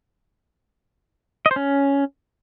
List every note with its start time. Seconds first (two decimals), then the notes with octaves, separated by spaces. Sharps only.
1.46 D#5
1.51 C5
1.56 C#4